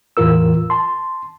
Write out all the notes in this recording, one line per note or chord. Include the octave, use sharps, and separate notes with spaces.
E2 A2 E3 F4 A#4 E6
A5 C6